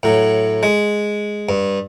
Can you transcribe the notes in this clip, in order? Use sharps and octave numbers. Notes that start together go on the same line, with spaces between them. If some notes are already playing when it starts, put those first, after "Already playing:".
A2 F#3
G#3
G2